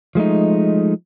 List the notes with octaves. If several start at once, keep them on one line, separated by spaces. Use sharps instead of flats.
F3 G#3 A3 D#4